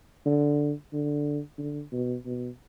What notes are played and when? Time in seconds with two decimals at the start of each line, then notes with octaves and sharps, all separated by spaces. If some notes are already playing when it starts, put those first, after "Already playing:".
0.26 D3
0.93 D3
1.59 D3
1.92 B2
2.26 B2